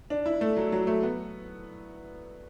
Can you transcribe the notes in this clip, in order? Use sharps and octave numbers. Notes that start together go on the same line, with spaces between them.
D4
E4
A3
F#3
F#3
A3
B3